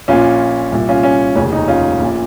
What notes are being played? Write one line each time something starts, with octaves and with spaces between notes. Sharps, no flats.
A#1 A#2 C#4 F4
C2 A#2
C#4 F4
C#4
F1 D#2 C#3 C#4
D#4
C#4 F4
A#1 A#2